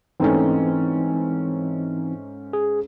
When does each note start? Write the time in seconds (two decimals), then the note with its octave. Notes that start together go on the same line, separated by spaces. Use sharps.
0.20 G#2 E3 A3 C4 C#4 D#4
2.53 G#4